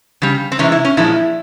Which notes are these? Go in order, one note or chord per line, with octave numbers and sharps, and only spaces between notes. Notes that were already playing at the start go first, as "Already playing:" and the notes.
C#3 G3
C4
C3 E3 G#3 C#4
E4
C#4
A#2 F3 G#3 E4